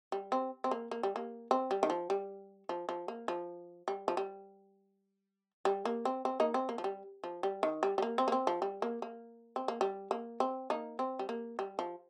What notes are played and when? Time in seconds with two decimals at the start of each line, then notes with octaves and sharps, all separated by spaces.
0.12 G3
0.32 C4
0.64 C4
0.71 A#3
0.91 A#3
1.03 G3
1.16 A#3
1.51 C4
1.71 G3
1.83 D#3
1.90 F3
2.10 G3
2.69 F3
2.89 F3
3.08 A#3
3.28 F3
3.88 G3
4.08 F3
4.17 G3
5.65 G3
5.85 A#3
6.05 C4
6.25 C4
6.40 A#3 D#4
6.54 C4
6.69 A#3
6.78 F3
6.84 G3
7.24 F3
7.43 G3
7.63 D#3
7.83 G3
7.98 G3
8.02 A#3
8.18 C4
8.28 A#3
8.32 C4
8.47 F3
8.62 G3
8.82 A#3
9.02 A#3
9.56 C4
9.68 A#3
9.81 G3
10.11 A#3
10.40 C4
10.70 A#3 D#4
10.99 C4
11.19 G3
11.29 A#3
11.59 G3
11.79 F3